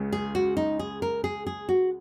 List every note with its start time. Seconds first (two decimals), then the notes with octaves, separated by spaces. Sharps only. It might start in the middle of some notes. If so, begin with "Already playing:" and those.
Already playing: C#2 C#3
0.12 G#4
0.35 F#4
0.57 D#4
0.79 G#4
1.02 A#4
1.24 G#4
1.47 G#4
1.69 F#4